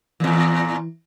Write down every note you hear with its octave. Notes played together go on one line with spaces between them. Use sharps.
E2 A#2 E3